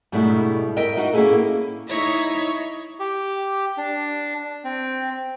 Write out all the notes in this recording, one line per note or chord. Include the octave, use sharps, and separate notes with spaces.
G#2 B2 G3 A3 D4 E4
A#4 D#5 E5 G5
D#4 F4 F#4 F#5
A#3 C#4 D#4 E4 G#4 A4
D#4 E4 C#5
G4
D4
C4